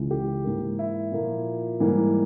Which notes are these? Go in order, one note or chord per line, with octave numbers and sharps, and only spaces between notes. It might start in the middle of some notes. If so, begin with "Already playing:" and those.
Already playing: C#2 C#3 E3 G#3
G4
G#2 E3 A#3
E4
A#2 F3 A#3
G#2 E3 G3 A#3